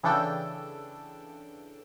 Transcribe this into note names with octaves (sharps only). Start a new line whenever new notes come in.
C#3 E3 D4 A4 G5